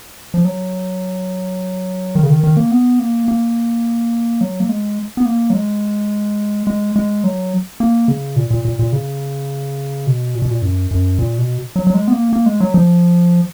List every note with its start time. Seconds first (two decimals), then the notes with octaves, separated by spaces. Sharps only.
0.34 F3
0.45 F#3
2.15 D#3
2.23 C#3
2.29 D#3
2.44 D#3
2.57 A#3
2.71 B3
2.99 A#3
3.28 A#3
4.41 F#3
4.60 A#3
4.69 G#3
5.17 B3
5.25 A#3
5.50 F#3
5.54 G#3
6.67 G#3
6.96 G#3
7.24 F#3
7.80 A#3
8.08 C#3
8.36 A#2
8.51 A#2
8.65 A#2
8.79 A#2
8.93 C#3
10.07 B2
10.35 A#2
10.42 B2
10.51 A#2
10.62 F#2
10.91 F#2
11.19 A#2
11.38 B2
11.76 F#3
11.87 F#3
11.94 G#3
12.08 B3
12.13 A#3
12.33 A#3
12.46 G#3
12.60 F#3
12.74 F3